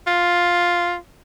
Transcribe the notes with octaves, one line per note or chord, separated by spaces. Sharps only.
F4